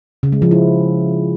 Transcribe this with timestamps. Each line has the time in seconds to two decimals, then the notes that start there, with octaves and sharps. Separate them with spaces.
0.23 C#3
0.32 G#3
0.42 F3
0.51 E4